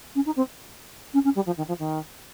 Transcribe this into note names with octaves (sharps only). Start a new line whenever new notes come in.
C#4
D#4
C4
C#4
C#4
G3
F3
D#3
F3
D#3